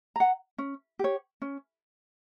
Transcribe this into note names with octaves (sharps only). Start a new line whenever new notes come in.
F#5 A#5
C#4
G4 C#5
C#4